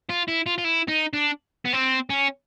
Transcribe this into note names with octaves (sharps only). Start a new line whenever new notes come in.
F4
E4
F4
F4
E4
D#4
D4
B3
C4
C#4